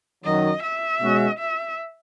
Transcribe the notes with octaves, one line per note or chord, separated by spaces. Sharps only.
F#2 D#3 F#3 D#5
E5
B2 G#3 C#4 F#4
E5